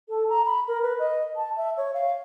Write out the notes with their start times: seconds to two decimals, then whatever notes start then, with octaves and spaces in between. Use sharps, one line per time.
0.09 A4
0.29 A#5
0.46 B5
0.68 A#4
0.83 B4
0.99 D#5
1.36 A5
1.57 E5
1.77 C#5
1.94 F5